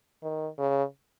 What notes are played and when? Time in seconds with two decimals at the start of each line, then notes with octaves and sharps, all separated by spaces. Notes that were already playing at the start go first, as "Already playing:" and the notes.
0.23 D#3
0.58 C#3